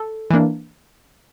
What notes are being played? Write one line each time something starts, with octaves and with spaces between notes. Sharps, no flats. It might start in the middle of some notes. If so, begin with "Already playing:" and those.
Already playing: A4
E3 A#3 D4